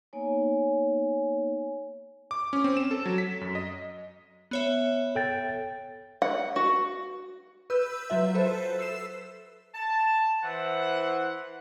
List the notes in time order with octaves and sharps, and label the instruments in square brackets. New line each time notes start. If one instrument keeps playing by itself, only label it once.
[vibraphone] A#3 B3 D#4 C#5 G#5
[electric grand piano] D6
C#4
C4
E7
A4
F#3
B6
F#2
D#5
[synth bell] B3 C#5 E5
[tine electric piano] A4 G5 A6
[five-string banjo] F#5
F#4
[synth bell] B4 E6 G6
F#3 F4 E5
A4 B4 C5
E6 C7 E7
[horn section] A5
E3 C5 F#5